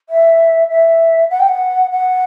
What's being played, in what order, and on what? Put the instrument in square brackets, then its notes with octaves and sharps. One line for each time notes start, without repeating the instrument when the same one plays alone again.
[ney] E5
E5
F#5
G5
F#5
F#5